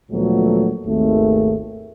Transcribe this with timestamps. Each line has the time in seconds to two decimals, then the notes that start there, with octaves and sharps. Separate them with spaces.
0.12 D2 A#2 F3 F#3 A3 B3
0.86 G#1 D#2 A3